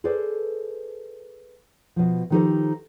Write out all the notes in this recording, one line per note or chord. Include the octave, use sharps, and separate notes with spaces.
G#4 A4 B4 C5 D5
B2 F3
D#3 F3 D#4 G4 A4 C5